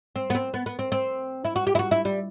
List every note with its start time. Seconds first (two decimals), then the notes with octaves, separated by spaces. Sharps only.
0.16 C4
0.30 B3
0.35 C4
0.54 B3
0.66 B3
0.79 C4
0.92 C4
1.45 E4
1.56 F#4
1.67 G4
1.75 E4
1.79 F#4
1.91 E4
2.05 G3